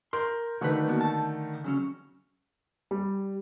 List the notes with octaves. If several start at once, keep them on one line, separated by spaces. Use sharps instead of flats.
A#4 C6 G6
D3 D#3 A3 F#4 B4
A#3 B3 F#4
A5
C#3 F#3 C#4
G3